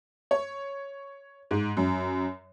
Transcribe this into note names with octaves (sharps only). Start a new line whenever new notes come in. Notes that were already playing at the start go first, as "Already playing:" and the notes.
C#5
G#2
F#2